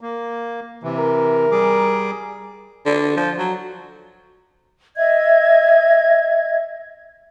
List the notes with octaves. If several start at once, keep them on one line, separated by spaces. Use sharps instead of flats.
A#3
C3 E3
A#4
G3 G#4 D6
D3
F3
F#3
D#5 E5 G#6